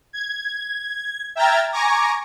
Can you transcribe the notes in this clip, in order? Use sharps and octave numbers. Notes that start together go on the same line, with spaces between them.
G#6
E5 G5 A#5 F6 G#6 A6
G#5 A#5 C#6 D6 G#6 A#6